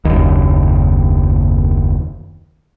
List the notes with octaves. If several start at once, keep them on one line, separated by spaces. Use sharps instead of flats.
F#1 D#2